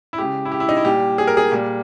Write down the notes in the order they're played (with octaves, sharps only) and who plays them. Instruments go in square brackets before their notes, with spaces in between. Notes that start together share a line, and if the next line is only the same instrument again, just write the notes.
[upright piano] E4
C#3 G#3 G4
E4
G4
E4
D#4
E4
A#2 G3 G4
G#4
A#4
G#4
A#2 G3